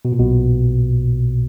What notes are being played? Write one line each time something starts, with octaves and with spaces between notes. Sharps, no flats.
B2
A#2
B1 B2